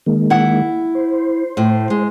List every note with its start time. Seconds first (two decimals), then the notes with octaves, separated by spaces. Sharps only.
0.06 D#3 G#3 A#3
0.30 E4 F#5
0.95 C5
1.57 A2
1.90 G#3